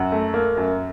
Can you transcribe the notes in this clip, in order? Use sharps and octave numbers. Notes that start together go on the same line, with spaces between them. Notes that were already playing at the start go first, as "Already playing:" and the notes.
Already playing: F#2 F#5 A#5
A3
A#3
F#2